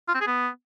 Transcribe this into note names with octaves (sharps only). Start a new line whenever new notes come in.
F4
C4
G#4
B3